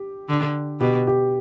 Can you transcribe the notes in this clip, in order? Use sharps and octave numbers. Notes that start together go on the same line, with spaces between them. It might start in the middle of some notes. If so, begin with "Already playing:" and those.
Already playing: G4
D3
B2 G4
G4